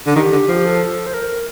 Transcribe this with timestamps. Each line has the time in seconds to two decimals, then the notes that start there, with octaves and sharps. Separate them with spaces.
0.07 D3
0.16 D#3 G4
0.33 D3
0.49 F3
0.54 G4
0.65 A4
1.06 C5
1.14 A#4